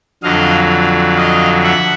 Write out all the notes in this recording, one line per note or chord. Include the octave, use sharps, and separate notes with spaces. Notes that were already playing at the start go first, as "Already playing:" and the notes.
F2 D3 F#3 D#5 F5
D#5 F5
E5 F#5